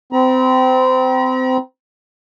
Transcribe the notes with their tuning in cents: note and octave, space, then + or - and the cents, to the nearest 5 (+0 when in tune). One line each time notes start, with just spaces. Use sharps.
C4 -25 A#5 +45